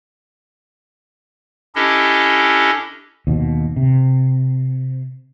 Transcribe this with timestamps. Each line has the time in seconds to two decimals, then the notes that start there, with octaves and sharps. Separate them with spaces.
1.75 C#4 D4 E4 G4 A4 D#5
3.27 D#2 B2
3.76 C3